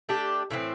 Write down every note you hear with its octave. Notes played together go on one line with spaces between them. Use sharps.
A3 D4 G4
A2 E3 A3 C4